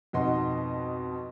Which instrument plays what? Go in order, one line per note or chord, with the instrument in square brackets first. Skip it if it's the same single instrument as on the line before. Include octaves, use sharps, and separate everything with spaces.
[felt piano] F2 G#2 B2 D#5 F#5 C6